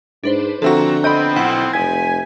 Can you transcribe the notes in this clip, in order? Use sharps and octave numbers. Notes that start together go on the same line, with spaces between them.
G#2 D4 B4 C5
D3 F3 C4 F#4 A4 E5 A#5
F3 B3 C4 D#5 B5 G6 D7
B1 E4 F#5
F1 G#5 G#6 B6